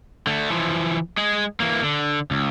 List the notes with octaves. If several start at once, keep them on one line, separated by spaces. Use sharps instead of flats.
D3 A3
E3 F3
G#3 G#4
E3 A#3
D3
C#2